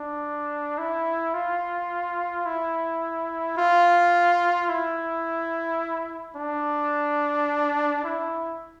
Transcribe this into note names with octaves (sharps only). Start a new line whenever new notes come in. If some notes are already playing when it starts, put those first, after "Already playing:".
Already playing: D4
E4
F4
E4
F4
E4
D4
E4